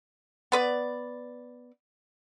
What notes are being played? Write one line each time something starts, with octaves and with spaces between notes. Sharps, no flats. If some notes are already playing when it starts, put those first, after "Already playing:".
B3 B4 D5